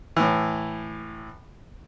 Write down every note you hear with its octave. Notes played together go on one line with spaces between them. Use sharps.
A2 E3